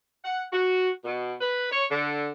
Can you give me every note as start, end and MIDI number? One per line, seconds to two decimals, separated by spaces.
0.24 0.44 78
0.53 0.90 66
1.05 1.35 47
1.41 1.68 71
1.71 1.83 73
1.91 2.29 50